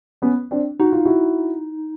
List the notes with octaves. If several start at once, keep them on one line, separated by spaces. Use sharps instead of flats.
B3 C#4
C4 D4
D#4 F#4
F4
E4 F#4